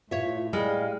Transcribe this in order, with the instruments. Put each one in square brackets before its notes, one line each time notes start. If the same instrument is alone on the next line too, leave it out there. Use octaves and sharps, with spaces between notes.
[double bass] A2 [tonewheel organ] F4 [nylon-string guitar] C#5 E5
[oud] G3 [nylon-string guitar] G#3 [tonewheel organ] F5